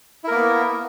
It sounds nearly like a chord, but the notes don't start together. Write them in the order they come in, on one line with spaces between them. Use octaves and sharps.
E4 A#4 A#3 B3